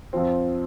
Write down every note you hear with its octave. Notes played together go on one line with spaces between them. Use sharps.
F2 F3 C4